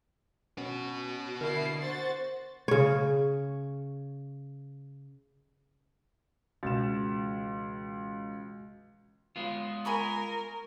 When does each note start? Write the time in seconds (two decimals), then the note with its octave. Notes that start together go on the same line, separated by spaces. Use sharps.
0.58 B3 C#4 F#4
1.41 D3 E4 A#4 C7
1.80 F#4 C5 A6
2.68 C#3 C#5
6.63 C#2 B2 E3 G#3 F#4 A6 E7
9.36 G#3 B3 F4
9.85 A#4 G#5 B5 C#6